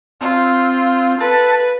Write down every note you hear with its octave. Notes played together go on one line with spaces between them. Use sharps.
C4 F4
A4 B4 A5